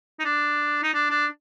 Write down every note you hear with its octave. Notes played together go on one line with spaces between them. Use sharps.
D#4
D4
D#4
D4
D4